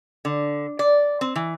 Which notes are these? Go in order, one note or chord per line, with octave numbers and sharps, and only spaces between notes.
D3
D5
C4
E3